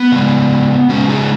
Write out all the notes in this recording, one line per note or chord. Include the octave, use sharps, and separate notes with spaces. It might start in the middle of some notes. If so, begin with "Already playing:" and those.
Already playing: B3
C#3 G#3
C#3 G#3 C#4 F#4
D#4 G#4